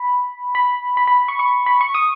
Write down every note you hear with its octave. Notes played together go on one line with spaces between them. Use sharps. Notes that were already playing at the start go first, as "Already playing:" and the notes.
Already playing: B5
B5
B5
B5
C#6
C#6
B5
C#6
D#6